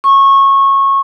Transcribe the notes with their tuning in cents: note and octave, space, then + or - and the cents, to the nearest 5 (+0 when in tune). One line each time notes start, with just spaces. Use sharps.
C#6 -20